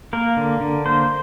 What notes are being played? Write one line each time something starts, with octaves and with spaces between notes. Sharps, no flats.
A#3 A#4
D3
D3
A#3 C5